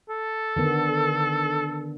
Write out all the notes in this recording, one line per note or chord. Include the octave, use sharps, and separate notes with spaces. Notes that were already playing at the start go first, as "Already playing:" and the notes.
A4
D3 D#3 B3